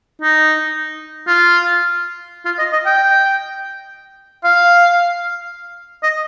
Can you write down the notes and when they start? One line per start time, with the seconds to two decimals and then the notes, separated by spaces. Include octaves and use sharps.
0.22 D#4
1.27 F4
2.46 F4
2.59 D#5
2.73 D#5
2.86 G5
4.44 F5
6.03 D#5